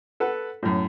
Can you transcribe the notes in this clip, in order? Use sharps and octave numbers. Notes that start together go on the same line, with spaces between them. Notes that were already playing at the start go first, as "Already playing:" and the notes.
A4 B4 F#5
F#2 A2